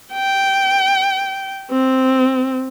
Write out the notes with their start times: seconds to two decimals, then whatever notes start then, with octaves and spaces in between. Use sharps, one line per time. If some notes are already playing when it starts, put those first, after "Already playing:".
0.13 G5
1.71 C4